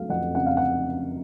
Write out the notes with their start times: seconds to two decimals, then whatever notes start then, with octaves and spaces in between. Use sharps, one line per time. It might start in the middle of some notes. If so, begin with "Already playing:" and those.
Already playing: F#3 A3 F5
0.09 F2 F#5
0.35 C#3 F#5
0.46 F5
0.57 F#5